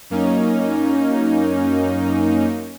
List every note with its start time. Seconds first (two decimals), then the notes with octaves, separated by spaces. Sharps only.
0.10 F#2 A#3 C#4 D#4